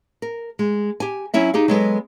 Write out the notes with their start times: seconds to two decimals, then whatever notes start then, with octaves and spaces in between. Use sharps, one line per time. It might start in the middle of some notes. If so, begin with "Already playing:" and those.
0.22 A#4
0.59 G#3
1.00 G4 G#5
1.34 F#3 C#4 E4 E5
1.54 D#4 G4 G#4 F5
1.68 F#3 G#3 B3 A4